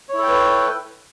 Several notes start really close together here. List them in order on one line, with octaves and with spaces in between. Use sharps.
C#5 E4 A4 G5 B4